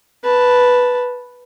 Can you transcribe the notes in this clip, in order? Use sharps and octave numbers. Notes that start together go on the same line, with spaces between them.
B4 A5